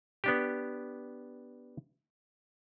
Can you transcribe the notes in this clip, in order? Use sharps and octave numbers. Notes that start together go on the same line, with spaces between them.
B3 D4 G4